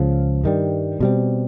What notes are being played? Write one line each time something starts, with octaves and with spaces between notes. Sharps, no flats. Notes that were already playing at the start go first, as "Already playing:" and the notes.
Already playing: C#2 C#3 F3
G2 D#3 G3
B2 G3 C4